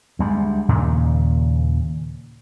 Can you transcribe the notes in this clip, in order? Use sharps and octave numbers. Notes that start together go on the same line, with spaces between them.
D2 G3 G#3
D#2 A#2 C#3